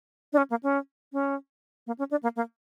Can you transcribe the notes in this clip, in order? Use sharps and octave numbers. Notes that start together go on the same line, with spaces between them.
D4
C#4
A#3
C#4
C#4
A#3
C#4
D4
A#3
A#3